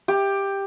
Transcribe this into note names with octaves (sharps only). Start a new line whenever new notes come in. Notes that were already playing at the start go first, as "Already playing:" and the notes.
G4